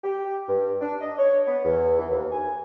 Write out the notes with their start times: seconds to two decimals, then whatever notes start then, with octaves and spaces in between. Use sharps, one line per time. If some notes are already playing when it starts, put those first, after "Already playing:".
0.03 G4
0.49 G2
0.81 D4
1.01 D#5
1.18 C#5
1.46 B3
1.65 E2
1.99 E3
2.11 D#2
2.32 G#5